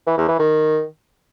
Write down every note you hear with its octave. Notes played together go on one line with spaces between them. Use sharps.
E3
E2
E3
D#3